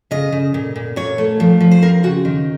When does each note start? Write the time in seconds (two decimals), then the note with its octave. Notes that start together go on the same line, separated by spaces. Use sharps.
0.11 C#3 D#5
0.32 C#3
0.54 A#2
0.76 A#2
0.96 A#2 C#5
1.18 A3
1.40 F3
1.61 F3
1.71 C5
1.82 C4 A#4
2.03 C#3 F#4
2.25 D#3